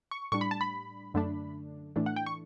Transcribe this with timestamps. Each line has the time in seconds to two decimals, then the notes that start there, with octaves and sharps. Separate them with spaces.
0.11 C#6
0.32 A2 G3 D4 C#6
0.41 B5
0.51 A5
0.61 B5
1.14 F#2 D3 A3 D4
1.96 A2 E3 A3 D4
2.06 F#5
2.16 G5
2.26 C#6